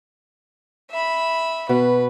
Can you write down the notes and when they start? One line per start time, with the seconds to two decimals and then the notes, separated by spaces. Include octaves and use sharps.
0.91 E5 B5
1.69 B2 B4